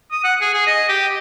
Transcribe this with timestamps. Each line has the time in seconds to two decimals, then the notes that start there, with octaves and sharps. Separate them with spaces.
0.12 D#6
0.24 F#5
0.41 G#4
0.53 G#4
0.67 D#5
0.89 G4